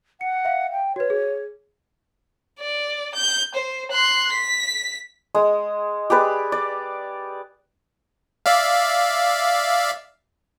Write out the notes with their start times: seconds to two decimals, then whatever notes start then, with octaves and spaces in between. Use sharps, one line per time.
0.21 F#5 C#7
0.45 E5 F5
0.71 G5
0.96 F#4 B4 C#5
1.10 G#4
2.60 D5
3.15 G6
3.55 C5
3.92 C6 F#6
4.33 B6
5.35 G#3 D#6
6.10 G4 G#4 B4 D5
6.52 D5
8.46 D5 E5 F5